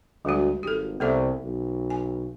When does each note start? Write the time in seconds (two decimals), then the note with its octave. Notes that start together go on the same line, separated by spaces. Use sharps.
0.25 D2 G3 G#3 F#4
0.63 G#1 G4 A4
1.00 C2 B3 A4 E5
1.44 B1
1.90 G#5